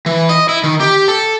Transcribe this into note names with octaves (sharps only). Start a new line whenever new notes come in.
E3
D#5
E4
D#3
G4
A4